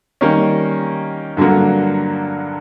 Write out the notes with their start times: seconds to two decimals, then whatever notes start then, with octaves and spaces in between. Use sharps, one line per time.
0.21 D#3 G3 A#3 C#4
1.37 G2 D3 F#3 A#3